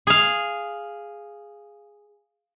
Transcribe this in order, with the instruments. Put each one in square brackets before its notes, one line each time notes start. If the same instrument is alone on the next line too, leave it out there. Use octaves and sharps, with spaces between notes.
[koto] G#4 F5